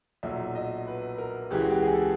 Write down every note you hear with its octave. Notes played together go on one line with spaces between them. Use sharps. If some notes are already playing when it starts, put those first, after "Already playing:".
B1 A#2 F#3 E5
D#5
B4
A#4
C#2 C#3 E3 G#3 G4
F#4
G4
G#4
A4